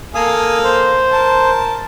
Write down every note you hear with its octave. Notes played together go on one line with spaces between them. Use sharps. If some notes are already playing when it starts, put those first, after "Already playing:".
A#3 A4 F5 G#5 D#6
C5
A#4 A5